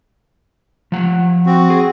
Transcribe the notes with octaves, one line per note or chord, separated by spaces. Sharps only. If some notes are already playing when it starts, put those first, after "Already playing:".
F3 F#5
C4 F#4
G#4